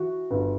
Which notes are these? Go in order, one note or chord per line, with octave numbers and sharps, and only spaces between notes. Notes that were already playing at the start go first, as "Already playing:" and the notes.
Already playing: E3 F#4
G1